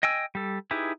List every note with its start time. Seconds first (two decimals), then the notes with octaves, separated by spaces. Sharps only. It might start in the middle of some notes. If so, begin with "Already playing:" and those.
0.03 D#5 G5 G#5 E6
0.35 G3 A4
0.71 D#4 E4 G4 G#4 B4